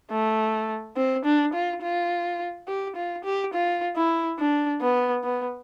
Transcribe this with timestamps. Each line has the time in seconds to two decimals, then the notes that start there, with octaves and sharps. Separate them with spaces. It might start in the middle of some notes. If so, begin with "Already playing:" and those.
0.11 A3
0.96 C4
1.25 D4
1.53 F4
1.82 F4
2.67 G4
2.96 F4
3.24 G4
3.53 F4
3.96 E4
4.39 D4
4.81 B3
5.24 B3